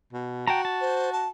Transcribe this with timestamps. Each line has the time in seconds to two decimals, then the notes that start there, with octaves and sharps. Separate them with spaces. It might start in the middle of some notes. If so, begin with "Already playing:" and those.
0.13 B2
0.48 F#4 G5 A5 A#5
0.65 A5
0.81 C5
1.12 A5